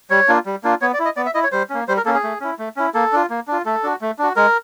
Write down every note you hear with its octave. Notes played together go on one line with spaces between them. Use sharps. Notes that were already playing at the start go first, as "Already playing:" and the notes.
G3 C#5
A#3 D4 F4
G3
A#3 D4 F4
B3 C#5
D5
E4
D#5
B3 D5
E5
E4 D#5
C#5
G3 C5
A#3 C#4
G3 C5
A#4
A#3 C#4 A4
G#4
A3
C#4 E4
A3
C#4 E4
A#3 A4
D4 F4
A#3
D4 F4
A3 A4
D4 F#4
A3
D4 F#4
G#3 A#4